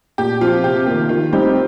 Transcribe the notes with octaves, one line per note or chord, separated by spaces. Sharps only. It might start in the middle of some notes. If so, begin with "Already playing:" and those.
A#2 G4
F3 C4 F4
C3 G4
D#3 A#3 G4
D#3 F4
G3 C4 D#4 G4